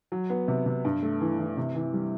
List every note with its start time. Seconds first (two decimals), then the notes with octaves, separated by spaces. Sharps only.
0.12 F#3
0.30 B3
0.48 C3
0.66 C3
0.85 G2
1.03 A3
1.21 E3
1.39 E3
1.57 C3
1.75 E3
1.94 G3